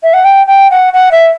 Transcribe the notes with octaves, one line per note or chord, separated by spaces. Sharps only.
E5
F#5
G5
G5
F#5
F#5
E5